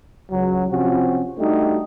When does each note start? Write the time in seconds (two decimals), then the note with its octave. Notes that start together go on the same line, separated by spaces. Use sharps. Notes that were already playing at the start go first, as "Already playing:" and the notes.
0.31 C#2 F#3
0.71 C3 F3 C4 C#4 F4 F#4
1.38 G3 A3 D4 D#4 F#4 G4